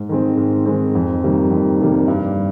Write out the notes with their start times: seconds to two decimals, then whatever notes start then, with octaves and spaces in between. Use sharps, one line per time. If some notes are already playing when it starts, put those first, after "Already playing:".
Already playing: G#2
0.09 D#3 G#3 C4
0.37 G#2
0.66 D#3 G#3 C4
0.95 F2
1.23 C3 D#3 G3 A#3
1.51 F2
1.80 C3 D#3 G3 A#3
2.08 G2